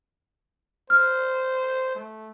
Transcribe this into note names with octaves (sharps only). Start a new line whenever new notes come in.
C5 F6
A3